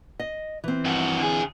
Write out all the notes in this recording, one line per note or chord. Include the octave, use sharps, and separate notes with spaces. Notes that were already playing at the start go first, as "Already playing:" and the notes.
D#5
E3 C4
G2 F#4
D3 G#4